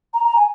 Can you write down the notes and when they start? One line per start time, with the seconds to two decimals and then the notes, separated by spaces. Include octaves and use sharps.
0.14 A#5
0.24 A#5
0.36 G#5